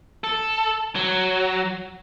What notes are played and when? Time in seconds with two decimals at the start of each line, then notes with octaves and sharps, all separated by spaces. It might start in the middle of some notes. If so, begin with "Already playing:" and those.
0.24 A4
0.96 F#3